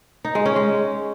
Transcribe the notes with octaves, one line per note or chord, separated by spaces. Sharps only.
D#4
G#3
C#4
G#3